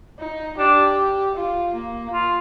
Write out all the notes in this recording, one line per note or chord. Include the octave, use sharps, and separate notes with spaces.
D#4
D4 G4
F4
A#3
F4